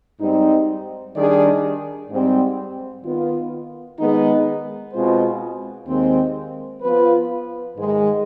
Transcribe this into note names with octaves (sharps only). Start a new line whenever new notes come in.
G#2 G3 C4 D#4
D#3 G3 D4 G#4 D5
G#2 G3 C4
D#3 B3 F4
D#3 G#3 B3 D#4
B2 G#3 C4 F4 C5
D#2 D#3 G#3 C4
F3 B3 F4 B4
G#2 D#3 G#3